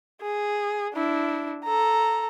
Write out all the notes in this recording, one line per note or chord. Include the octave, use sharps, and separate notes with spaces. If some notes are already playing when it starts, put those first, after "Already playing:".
G#4
D4 E4
A4 A#5